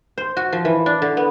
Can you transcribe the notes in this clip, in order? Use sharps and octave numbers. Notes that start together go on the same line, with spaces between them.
C5
F#4
F3
E3
D4
D3
B3